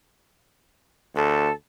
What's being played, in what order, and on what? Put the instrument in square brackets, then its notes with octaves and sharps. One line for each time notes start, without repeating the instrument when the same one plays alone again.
[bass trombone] D2 [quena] A4